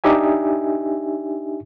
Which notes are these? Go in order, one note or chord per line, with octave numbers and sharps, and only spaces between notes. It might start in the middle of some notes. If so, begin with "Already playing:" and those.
D4 D#4 G4 E5 G#5